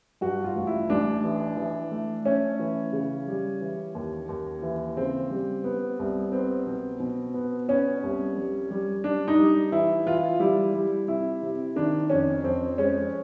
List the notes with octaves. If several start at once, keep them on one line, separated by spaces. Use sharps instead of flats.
G2 F#4
F4
A1
E4
A1 D4
E3
E3
A3
A3 C#4
E3
C#3
G3
E3
D#2
D#2
E3
C#3 C4
G3
B3
C2
B3 C4
B2
B2
B3
B3 C#4
C2
G3
G3
G3 D4
D#4
G3
E3 E4
E3 F4
G3 E4
G3
C3 E4
C3
D#3 D4
F2 C#4
F2 C4
G#3 C#4